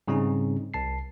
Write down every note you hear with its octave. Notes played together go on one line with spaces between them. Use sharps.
G#2 C#3 G3 C4 C#4 D#4
C2 A5 C7